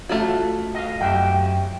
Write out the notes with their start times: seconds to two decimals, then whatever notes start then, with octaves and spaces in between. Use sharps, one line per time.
0.09 A3 F4 F#4
0.74 D#5 F5
1.01 F#2 G4 E5 G5